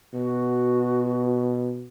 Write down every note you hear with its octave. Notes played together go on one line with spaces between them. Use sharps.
B2 F#4